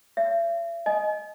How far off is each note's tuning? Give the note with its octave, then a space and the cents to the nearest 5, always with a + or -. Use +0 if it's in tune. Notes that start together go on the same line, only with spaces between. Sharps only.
C#5 +35 E5 +40
D#5 +0 G#5 +30